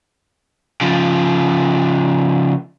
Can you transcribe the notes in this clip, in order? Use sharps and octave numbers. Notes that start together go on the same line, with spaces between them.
C#3 F3